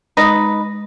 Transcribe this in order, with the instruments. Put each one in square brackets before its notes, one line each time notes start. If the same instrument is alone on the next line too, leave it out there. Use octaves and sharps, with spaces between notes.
[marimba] G#3 D#6 A#6 [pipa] D#4 B4